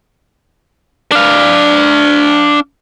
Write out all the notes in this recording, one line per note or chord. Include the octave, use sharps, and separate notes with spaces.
D4 F5